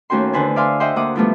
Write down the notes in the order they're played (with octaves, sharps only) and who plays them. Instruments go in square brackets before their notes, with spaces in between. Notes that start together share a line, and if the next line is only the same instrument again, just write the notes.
[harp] D#2 A3 C#4 F#4 G5 C6
E2 D3 B4 C5 G#5
D5 E5 F5 G#5 C6
C5 D#5 E5 F#5 G5 C6
D2 A#3 F#5 D6 D#6
E3 F3 G3 A3 B3